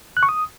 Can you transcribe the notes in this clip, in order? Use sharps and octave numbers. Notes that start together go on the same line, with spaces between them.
F#6
C#6
D#6